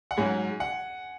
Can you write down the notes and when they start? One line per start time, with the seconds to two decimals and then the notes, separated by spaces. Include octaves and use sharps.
0.11 F#5
0.17 G#2 F#3 C#4 F#4 G#5
0.60 F#5